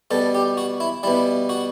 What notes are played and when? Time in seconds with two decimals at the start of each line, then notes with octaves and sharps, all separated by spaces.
0.11 B2 G3 A4
0.35 G4
0.57 F#4
0.80 E4
1.03 B2 G3 E4
1.49 F#4